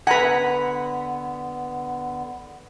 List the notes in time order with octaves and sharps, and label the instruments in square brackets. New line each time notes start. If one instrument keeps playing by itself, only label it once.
[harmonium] D3 B3 [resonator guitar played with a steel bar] B4 F#5 [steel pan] G#5 A#5 B5